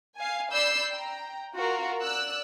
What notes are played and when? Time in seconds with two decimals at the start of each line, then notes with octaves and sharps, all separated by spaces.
0.17 F5 G#5
0.51 D5 B5 E6 G6 C7
0.90 G5 A#5
1.55 F4 F#4 A#4
2.01 D5 E6 F#6